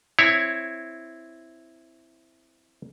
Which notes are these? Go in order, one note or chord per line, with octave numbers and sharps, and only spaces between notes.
C4 E4 C#5